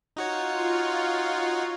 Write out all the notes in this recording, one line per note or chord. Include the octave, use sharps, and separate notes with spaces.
D#4 F4 F#4 C#5